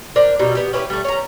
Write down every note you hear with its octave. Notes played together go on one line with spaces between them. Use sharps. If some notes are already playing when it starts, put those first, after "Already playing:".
D4 A#4 C5
B2 F#3 G3 D#4
B3 G4
C#4 E4 G4 B4
G3 A3
C#4 A#5